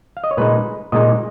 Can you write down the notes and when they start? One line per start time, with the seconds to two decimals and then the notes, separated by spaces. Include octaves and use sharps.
0.17 F5
0.24 D#5
0.31 C#5
0.37 A#2 G#3 D#4 B4
0.92 A#2 G#3 D#4 D#5